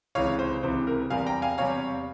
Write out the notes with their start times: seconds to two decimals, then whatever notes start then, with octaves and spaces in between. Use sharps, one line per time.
0.15 C#2 C3 E3 C#5 F5
0.39 C5
0.63 C#2 C3 E3 C5
0.87 A#4
1.10 E2 C3 G3 F5 G#5
1.26 G5 A#5
1.42 F5 G#5
1.58 E2 C3 G3 C#5 F5